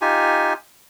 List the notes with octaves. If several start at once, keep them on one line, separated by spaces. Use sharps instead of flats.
D#4 F4 G4 G#5